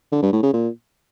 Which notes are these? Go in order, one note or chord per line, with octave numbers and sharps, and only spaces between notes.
D3
G2
A2
C#3
A#2